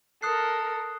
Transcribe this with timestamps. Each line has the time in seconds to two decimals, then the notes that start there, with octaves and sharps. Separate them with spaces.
0.22 A4 A#4 D#6 F#6 C7